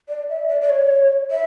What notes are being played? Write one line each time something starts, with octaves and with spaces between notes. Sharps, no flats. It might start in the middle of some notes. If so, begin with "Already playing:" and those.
D5
E5
D5
D5
C#5
E5